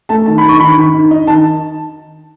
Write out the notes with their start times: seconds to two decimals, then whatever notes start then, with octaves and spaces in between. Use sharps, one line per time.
0.09 A3 A5
0.26 D#3 A5
0.38 B5
0.44 D#3 C#6
0.60 D#3 B5
0.77 D#3
0.94 D#3
1.11 D#4
1.27 D#3 A5